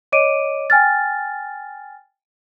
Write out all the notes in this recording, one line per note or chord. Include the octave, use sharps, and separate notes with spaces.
C#5 D#5 D6 D7 D#7
G5 G#5 F6 A6